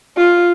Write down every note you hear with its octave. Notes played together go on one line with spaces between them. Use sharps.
F4